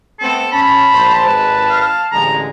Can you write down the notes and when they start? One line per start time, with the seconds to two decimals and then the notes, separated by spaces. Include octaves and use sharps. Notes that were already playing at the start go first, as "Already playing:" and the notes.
0.20 A3 B3 C4 A4
0.52 C#4 A5 B5
0.92 A#1 C5
1.24 G#1 G#3 B4
1.70 F5
2.12 A1 D3 G#3 A#5